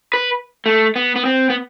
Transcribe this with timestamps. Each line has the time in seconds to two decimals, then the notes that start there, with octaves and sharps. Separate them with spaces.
0.14 B4
0.66 A3
0.96 B3
1.16 B3
1.25 C4
1.50 B3